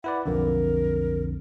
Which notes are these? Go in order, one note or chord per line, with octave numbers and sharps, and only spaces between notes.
E4 B4 D5 F#5
B1 F2 D3 A#4